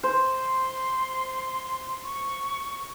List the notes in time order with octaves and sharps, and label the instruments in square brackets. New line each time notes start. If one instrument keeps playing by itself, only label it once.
[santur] C5
[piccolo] C6
C#6